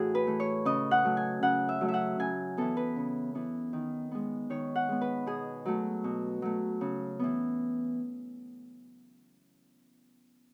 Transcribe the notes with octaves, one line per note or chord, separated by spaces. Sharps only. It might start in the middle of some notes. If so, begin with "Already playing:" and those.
Already playing: A2 E3 F#4 G#4
B4
E3 A3
C#5
C#3 D#5
F#5
F#3 A3
G#5
C#3 F#5
E5
F#3 A3
E5
F#5
C#3 G#5
E3 B3 A4
B4
C#3
E3 B3
D#3
G#3 B3
D#3 C#5
F#5
G#3 B3
B4
B2 G#4
F#3 A3
B2
F#3 A3
C#3
E3 B3